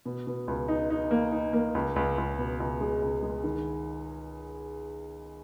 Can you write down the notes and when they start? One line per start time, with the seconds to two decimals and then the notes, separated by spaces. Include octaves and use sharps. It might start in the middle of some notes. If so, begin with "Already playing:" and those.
0.06 B2
0.27 B2
0.48 C#2
0.68 D#4
0.90 D#4
1.11 A#3
1.32 D#4
1.53 A#3
1.75 C#2
1.96 C#2
2.18 C#2
2.38 B2
2.60 C#2
2.81 G#3
3.02 C#2
3.23 G#3
3.44 D#3